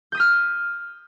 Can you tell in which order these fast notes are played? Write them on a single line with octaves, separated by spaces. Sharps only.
G6 D#6 B6 F6